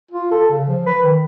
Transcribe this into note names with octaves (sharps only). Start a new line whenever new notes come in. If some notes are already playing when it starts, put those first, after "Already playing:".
F4
A4
C#3
F3
B4
D#3